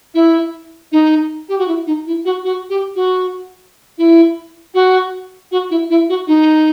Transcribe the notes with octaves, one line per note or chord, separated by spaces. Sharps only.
E4
D#4
G4
F#4
E4
D#4
E4
F#4
F#4
G4
F#4
E4
F#4
F#4
E4
E4
F#4
D#4